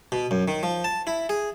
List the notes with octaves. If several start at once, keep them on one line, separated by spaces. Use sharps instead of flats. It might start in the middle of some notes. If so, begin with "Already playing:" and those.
B2
F#2
D#3
F3
A5
E4
G#4